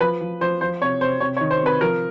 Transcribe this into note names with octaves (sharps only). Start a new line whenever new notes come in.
F3 B4
F3
F3 C5
F3 C5
C3 C#5
C3 C5
C3 C#5
C#5
D#3
C5
C3 B4
F3 A#4